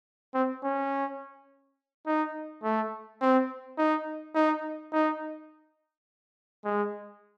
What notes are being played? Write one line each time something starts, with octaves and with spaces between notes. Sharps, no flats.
C4
C#4
D#4
A3
C4
D#4
D#4
D#4
G#3